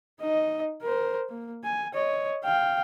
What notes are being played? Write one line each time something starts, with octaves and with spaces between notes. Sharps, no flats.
D#4 D#5
A#4 C5
A#3
G#5
C#5 D#5
F5 G5